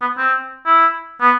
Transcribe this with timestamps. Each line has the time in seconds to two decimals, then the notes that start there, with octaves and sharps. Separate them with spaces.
0.01 B3
0.18 C4
0.66 E4
1.21 B3